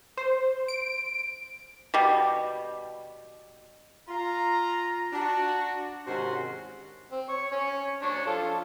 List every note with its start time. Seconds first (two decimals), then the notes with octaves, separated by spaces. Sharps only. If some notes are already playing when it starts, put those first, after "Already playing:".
0.17 C5
0.68 D7
1.94 B2 G3
4.09 F4 A#5
5.13 D4 F#4
6.07 G#2 C3 D#3 C#4 F#4 C6
7.12 C4
7.29 C#5 C#6
7.52 C#4 C#5
8.02 D4 C#5
8.26 F3 F4 A4